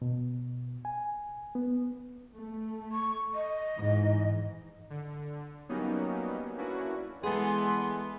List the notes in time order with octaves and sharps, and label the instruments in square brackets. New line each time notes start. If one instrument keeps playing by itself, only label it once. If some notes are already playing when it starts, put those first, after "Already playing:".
[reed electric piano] B2
G#5
B3
[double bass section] A3
[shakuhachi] C#6
D#5
[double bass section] G#2 E3
[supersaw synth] D3
F#3 G3 A#3 B3 C#4 D#4
A#3 C#4 D4 E4 F#4 B4
[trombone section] E3 B3 [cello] G#3 [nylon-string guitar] G#4 A4 [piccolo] C6